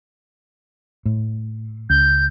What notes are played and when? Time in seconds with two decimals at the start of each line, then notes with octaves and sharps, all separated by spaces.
1.06 A2
1.90 C#2 G6